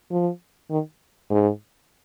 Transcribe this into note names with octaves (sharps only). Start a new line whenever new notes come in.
F3
D#3
G#2